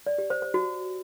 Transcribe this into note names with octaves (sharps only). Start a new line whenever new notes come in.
D5
G4
C5
C5
F#4